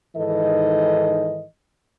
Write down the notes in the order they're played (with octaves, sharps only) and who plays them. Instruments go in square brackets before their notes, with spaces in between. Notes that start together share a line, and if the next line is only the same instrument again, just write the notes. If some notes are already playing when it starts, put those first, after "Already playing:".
[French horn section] G#2 D#3 E3 A4 D#5